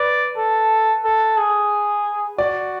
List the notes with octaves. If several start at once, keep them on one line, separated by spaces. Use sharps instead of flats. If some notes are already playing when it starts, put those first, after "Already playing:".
Already playing: B4 D5
A4
A4
G#4
F#4 D5